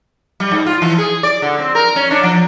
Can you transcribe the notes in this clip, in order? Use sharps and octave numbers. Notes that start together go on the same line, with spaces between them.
G3
G#2
F4
E3
G#4
D5
D3
C4
A#4
C#4
D4
F3